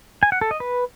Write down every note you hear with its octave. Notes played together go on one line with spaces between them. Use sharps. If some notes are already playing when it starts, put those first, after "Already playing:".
G#5
F#5
A4
D#5
B4